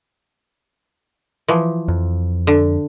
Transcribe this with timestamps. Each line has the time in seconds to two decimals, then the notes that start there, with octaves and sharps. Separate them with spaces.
1.48 E3 F3
1.88 F2
2.47 D3